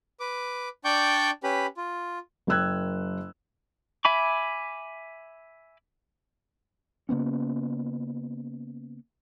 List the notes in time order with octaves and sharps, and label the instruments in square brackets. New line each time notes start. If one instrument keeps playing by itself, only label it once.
[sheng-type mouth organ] B4 D6
D4 D5 G5 C#6 D6 G6
C#4 G4 B4 B5
F4
[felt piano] F#1 A#4 G5 E6 F#6 G#6
[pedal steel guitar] E5 G#5 B5 D6
[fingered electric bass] C#3 A#3 B3 C#4